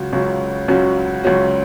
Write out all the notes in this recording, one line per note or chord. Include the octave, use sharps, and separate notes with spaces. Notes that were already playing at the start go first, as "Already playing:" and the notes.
Already playing: C#2 C#3 F#3 C#4 F#4
C#2 C#3 F#3 C#4 F#4
C#2 C#3 F#3 C#4 F#4
C#2 C#3 F#3 C#4 F#4